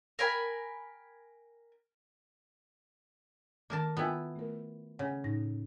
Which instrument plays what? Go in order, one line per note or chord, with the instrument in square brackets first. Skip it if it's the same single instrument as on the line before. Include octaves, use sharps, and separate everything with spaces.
[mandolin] A#4 G5 G#5 B5
[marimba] D#3 [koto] A#3 A#4 A5
[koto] B3 E4 [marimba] F4 G5 G#5
[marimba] A3 A#4
[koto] C#3 [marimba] F#5 G#5
[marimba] A2 D#4 A#6